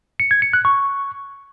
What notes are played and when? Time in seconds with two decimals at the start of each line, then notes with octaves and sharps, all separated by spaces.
0.20 C#7
0.31 G#6
0.42 C#7
0.53 F#6
0.65 C#6